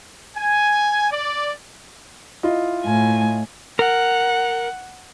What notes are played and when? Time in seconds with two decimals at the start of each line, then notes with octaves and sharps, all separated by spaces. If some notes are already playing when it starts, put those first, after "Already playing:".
0.37 G#5
1.11 D5
2.43 E4 F4 D#5
2.84 A2 G#5
3.79 A#4 F#5